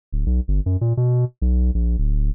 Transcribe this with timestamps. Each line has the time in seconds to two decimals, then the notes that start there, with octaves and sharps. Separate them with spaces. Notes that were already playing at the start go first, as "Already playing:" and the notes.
0.12 D1
0.26 B1
0.48 G1
0.66 F#2
0.81 A#2
0.97 B2
1.42 B1
1.74 A#1
1.98 D1